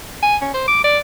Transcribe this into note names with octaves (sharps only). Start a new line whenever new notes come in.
G#5
C#4
C5
D6
D5